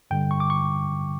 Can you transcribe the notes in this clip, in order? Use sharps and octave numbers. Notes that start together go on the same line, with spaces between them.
G2 D3 G3 G5
C#6
D6
C#6